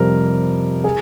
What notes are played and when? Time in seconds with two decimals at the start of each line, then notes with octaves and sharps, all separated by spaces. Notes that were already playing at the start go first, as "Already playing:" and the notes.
Already playing: F2 C3 G3 A#4
0.84 G#4